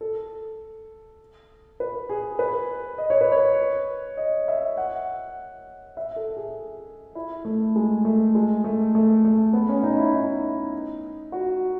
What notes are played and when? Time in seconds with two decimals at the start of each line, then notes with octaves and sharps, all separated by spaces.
0.01 A4
1.80 B4
2.09 G#4
2.39 B4
2.98 D#5
3.10 C#5
3.21 B4
3.32 C#5
4.17 D#5
4.48 E5
4.77 F#5
5.97 E5
6.16 A4
6.36 G#4
7.15 E4
7.45 A3
7.76 G#3
8.05 A3
8.35 G#3
8.64 A3
8.95 A3
9.25 A3
9.53 B3
9.69 C#4
9.83 D#4
9.98 E4
10.13 D#4
11.32 F#4